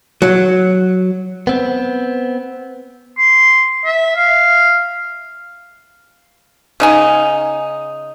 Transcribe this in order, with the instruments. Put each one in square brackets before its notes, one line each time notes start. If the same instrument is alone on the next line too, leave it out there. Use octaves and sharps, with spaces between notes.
[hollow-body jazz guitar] F#3
[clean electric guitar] B3 C4
[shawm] C6
E5
F5
[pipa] C#3 D#4 G#5